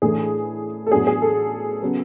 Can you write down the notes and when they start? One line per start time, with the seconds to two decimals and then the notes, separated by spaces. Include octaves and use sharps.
0.02 A2 E3 A3 D4 G#4
0.86 A4
0.92 A2 F#3 B3 D4 G#4
1.07 G#4
1.22 A4
1.82 C#3 F#3 B3